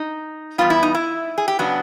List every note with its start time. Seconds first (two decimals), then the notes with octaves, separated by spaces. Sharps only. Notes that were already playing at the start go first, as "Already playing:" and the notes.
Already playing: D#4
0.58 E2 B2 G3 B3 F4
0.70 E4
0.83 D#4
0.95 E4
1.38 G#4
1.48 G4
1.59 C#3 F#3 B3 D4 F#4